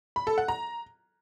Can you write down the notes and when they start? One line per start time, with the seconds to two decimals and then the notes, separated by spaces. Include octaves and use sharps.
0.16 B5
0.27 A4
0.38 F#5
0.48 A#5